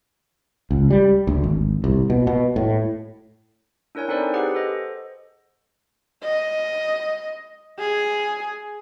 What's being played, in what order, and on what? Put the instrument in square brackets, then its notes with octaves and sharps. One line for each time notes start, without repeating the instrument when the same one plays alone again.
[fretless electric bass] C#2
G3
D2
G#1
C2
B2
B2
A2
[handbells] D4 E4 A#4 C#5 G#5
C4 D#4 A4 C5 D5
G4 G#4 B4 F#5
A4 C5 D#5
[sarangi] D#5
G#4